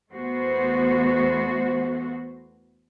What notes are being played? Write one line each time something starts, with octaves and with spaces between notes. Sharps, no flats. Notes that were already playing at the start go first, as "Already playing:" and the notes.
E2 A3 B3 F#4 C5